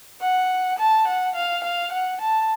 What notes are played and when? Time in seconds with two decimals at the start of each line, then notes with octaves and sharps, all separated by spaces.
0.21 F#5
0.78 A5
1.07 F#5
1.35 F5
1.64 F5
1.92 F#5
2.21 A5